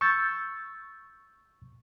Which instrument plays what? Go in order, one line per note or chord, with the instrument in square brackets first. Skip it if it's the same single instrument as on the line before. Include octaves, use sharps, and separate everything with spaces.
[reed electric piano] C#6 E6 G6 A6